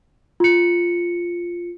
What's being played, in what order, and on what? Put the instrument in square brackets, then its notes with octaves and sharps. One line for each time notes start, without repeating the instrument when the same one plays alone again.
[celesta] F4 C#7